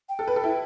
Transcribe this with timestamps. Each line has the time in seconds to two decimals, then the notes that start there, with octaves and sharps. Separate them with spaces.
0.09 G5
0.19 A4
0.28 B4
0.36 A4
0.44 E4